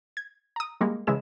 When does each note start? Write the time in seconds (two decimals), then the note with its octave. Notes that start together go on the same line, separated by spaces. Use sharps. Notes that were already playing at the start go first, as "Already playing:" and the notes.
0.17 G#6
0.56 A#5 D#6
0.81 G3 G#3 A#3
1.07 C#3 E3 G#3 E4 G#4 E7